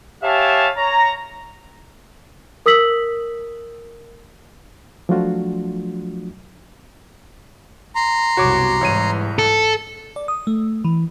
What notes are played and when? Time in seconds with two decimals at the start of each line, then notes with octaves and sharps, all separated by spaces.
0.24 G4 C#5 E5 F5 G#5 A5
0.78 C#5 A#5
2.66 A#4 D#6 E6 B6 F#7
5.09 F3 F#3 A3 D4 F4 F#4
7.95 A#5 C6
8.37 C2 F#2 B2 F#4 C#5 D6
8.81 C2 G#2 E3 C#5 D#7
9.39 A4
10.16 D5
10.28 D#6
10.47 A3
10.85 E3